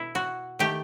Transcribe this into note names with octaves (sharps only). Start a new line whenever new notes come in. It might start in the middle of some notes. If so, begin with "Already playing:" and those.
Already playing: B2 E4
F#4
D#3 A3 G4